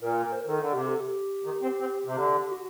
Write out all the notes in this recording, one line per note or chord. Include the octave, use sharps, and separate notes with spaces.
A#2 A#4
A#4
C5
A#4
D#3 A4
D3
C3 G4
A4
G4
D#3
C4
C4
C3
D3 G4
F#4